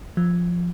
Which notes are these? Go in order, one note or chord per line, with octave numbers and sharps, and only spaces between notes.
F3